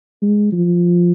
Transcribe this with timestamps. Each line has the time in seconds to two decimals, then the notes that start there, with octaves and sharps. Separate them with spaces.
0.22 G#3
0.52 F3